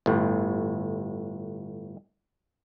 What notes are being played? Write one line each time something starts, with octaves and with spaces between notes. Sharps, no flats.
G1 A2